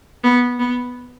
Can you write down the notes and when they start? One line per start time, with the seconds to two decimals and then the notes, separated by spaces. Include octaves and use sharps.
0.24 B3
0.59 B3